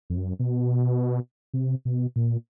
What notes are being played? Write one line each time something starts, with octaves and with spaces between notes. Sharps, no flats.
F2
F#2
B2
C3
B2
A#2